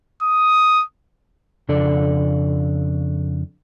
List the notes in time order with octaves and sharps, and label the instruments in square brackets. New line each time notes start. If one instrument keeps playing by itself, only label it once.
[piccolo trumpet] D#6
[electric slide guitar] F2 C#3 D4 A4 D5